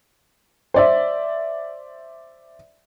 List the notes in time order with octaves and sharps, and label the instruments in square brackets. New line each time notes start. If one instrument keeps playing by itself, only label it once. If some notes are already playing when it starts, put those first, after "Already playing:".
[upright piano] C5 D5 E5